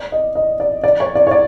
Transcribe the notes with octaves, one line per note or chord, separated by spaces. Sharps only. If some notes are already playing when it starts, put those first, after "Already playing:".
Already playing: D5
D#5
D#5
D5
D5
C#5
D5
C#5
D5